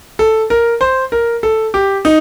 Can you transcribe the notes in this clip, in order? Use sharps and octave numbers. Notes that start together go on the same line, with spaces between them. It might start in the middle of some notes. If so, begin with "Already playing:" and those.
A4
A#4
C5
A#4
A4
G4
D#4